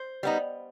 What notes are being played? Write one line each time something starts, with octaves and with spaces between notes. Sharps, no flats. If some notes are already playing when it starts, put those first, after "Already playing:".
Already playing: C5
G3 B3 D#4